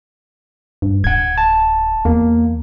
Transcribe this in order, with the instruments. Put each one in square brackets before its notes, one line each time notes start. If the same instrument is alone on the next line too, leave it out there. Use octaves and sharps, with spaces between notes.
[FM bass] G2
[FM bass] D1 [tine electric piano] F#5 G#6
[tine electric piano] A5
[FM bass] E2 [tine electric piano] A#3